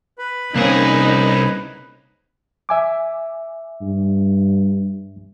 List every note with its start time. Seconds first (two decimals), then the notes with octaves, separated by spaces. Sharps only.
0.19 B4 B5
0.56 C2 A#3 C4 C#4 D#4 G#4
2.69 E5 G#5 D6
3.82 G2